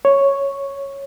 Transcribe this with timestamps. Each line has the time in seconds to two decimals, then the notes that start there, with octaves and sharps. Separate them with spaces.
0.05 C#5